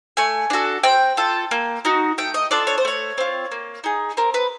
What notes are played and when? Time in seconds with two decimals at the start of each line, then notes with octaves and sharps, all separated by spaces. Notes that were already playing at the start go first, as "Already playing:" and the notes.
0.17 A3 G#5
0.50 D4 F#4 A4
0.83 C4 G5
1.17 F4 A4
1.51 A#3
1.85 D#4 F#4
2.18 A3 G5
2.34 D#5
2.51 D4 F4 A4 D5
2.67 C#5
2.78 C5
2.85 A3 C#5
3.18 C4 F4
3.52 A#3
3.84 D#4 G#4
4.17 C4 A#4
4.34 B4